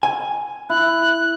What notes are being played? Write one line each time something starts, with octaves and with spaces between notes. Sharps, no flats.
G#5
E4 F#6